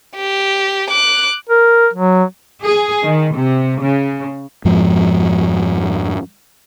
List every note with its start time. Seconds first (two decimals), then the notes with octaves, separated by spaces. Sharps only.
0.16 G4
0.90 D6 F#6
1.50 A#4
1.94 F#3
2.63 G#4
3.04 D#3
3.34 C3
3.81 C#3
4.65 F2 G#2 F3